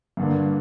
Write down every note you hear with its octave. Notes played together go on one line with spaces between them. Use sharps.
G2 D3 A#3